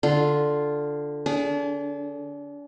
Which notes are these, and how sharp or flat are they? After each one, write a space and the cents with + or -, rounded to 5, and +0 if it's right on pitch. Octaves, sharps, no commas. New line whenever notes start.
D3 +0 F4 +0
D4 -35 G#4 +0